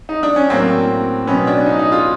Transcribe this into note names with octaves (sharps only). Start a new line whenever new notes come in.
D#4
D4
C#4
A2 F#3 A#3 C4
B2 F#3 B3 C#4
D4
D#4
D#4
F4